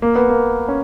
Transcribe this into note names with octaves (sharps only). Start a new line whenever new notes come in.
A#3
B3
A#3
C#4